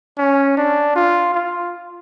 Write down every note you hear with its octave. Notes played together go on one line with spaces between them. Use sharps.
C#4
D4
F4
F4